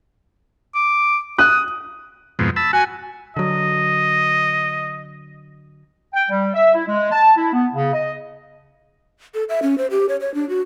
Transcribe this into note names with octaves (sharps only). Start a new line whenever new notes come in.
D6
D#6 F#6
F2 G#2 B2
A5 B5 E6
F#4 G#5
D3 F#3 D#5
G5
G3
E5
E4
G#3
A5
E4
B3
C#3
D#5
A4
E5
C#4
C5
G4
C#5
C#5
D4
F#4